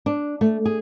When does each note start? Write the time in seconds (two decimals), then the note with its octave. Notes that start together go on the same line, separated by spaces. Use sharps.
0.06 D4
0.41 A3
0.66 G#4